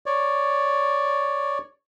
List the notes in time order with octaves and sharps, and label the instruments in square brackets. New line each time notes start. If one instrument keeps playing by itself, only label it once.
[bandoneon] C#5 D5